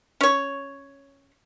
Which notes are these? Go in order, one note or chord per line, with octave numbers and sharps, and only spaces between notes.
C#4 C#5